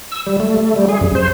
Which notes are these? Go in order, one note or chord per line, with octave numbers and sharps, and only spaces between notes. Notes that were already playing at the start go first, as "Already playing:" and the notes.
E6
G3
A3
A3
G3
G#4
F#2
C5